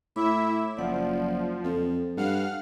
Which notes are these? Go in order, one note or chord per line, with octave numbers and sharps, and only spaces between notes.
A2 E4 E5 B5 D6
F#1 F3 D5 F#5
F2 A4
G2 F5 F#5 F6